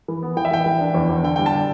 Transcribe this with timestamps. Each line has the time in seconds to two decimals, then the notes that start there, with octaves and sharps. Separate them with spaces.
0.08 E3
0.23 B3
0.37 E3 G5
0.45 E5
0.51 E3 G5
0.66 E3
0.81 D4
0.94 E2
1.09 E2
1.23 D3 G5
1.36 G3 G5
1.46 A5
1.53 D3